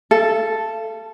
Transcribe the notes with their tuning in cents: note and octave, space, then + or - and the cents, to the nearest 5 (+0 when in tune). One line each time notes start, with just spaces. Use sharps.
A4 +0 F5 -45